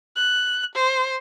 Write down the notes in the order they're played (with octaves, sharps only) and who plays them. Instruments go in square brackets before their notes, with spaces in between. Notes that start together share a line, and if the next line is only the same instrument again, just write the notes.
[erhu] F#6
C5